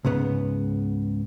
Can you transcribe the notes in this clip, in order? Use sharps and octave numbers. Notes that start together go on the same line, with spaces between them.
C#2 G#2 C#3 B3